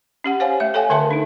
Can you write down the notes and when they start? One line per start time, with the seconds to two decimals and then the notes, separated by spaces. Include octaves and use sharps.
0.24 C#4 G4 F#5
0.40 G4 C5 C#5 F5 G#5
0.60 A3 E5
0.74 A4 C#5 F5 G5 G#5
0.90 D3 A4 A#4 E5 A5 C6
1.11 D4 D#4